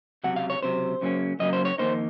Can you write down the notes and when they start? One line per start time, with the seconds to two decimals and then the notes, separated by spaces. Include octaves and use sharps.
0.24 C#2 C3 F#3 F#5
0.36 F5
0.50 C#5
0.62 C#2 C3 F#3 C5
1.01 F#2 C#3 F#3 A#3 C#4
1.39 F#2 C#3 F#3 A#3 C#4 D#5
1.53 C5
1.65 C#5
1.78 F2 D#3 A#3 D#4 C5